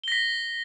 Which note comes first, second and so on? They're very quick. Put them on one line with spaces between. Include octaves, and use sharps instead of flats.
G7 A#6 B6